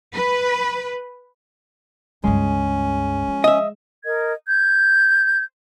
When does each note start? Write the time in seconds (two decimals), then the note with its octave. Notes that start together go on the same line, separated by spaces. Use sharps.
0.14 B4
2.24 C#2 G2 G#3 C#4
3.28 F3
3.44 D#5 E5
4.05 A#4 D#5 G#6
4.47 G6 G#6